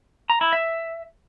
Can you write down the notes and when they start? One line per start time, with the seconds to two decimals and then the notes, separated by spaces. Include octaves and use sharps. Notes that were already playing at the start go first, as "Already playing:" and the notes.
0.30 A#5
0.41 E4
0.53 E5